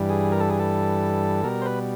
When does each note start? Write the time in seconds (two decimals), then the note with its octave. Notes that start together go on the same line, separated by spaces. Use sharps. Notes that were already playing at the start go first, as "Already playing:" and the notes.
Already playing: G2 E3 G3
0.09 G#4
0.32 A#4
0.40 A4
0.50 G#4
0.59 A4
1.44 B2 G3 A#4
1.62 C5
1.66 B4